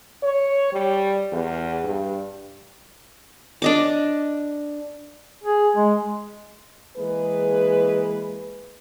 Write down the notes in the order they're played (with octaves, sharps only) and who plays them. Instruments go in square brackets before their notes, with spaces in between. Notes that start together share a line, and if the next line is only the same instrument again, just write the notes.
[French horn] C#5
G3
E2
G2
[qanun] D4 D#5 D6
[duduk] G#4
G#3
[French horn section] E3 G#3 A#3 G#4 B4